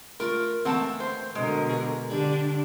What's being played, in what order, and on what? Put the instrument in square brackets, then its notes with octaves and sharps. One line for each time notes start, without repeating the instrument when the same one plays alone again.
[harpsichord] A3 F4 [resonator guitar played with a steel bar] A#4
[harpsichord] E3 A3 A#3 [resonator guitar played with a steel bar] C4 F#5 A5
[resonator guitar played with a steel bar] C5
[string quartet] B2 D3 A#4 [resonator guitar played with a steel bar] G#3
[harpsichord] G#4
[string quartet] D3 D4 [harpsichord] G3